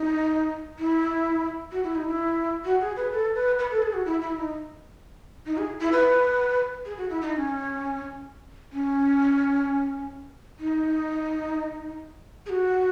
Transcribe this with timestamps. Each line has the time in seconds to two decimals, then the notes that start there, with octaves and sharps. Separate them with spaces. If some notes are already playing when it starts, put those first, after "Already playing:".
Already playing: D#4
0.79 E4
1.72 F#4
1.84 E4
1.95 D#4
2.08 E4
2.65 F#4
2.81 G#4
2.97 B4
3.12 A4
3.35 B4
3.59 B4
3.71 A4
3.82 G#4
3.94 F#4
4.06 E4
4.21 E4
4.37 D#4
5.46 D#4
5.57 G#4
5.81 E4
5.92 B4
6.86 G#4
6.98 F#4
7.10 E4
7.22 D#4
7.33 D#4
7.36 C#4
8.73 C#4
10.60 D#4
12.46 G#4
12.50 F#4